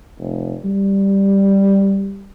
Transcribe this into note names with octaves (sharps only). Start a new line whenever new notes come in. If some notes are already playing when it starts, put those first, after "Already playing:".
F1
G3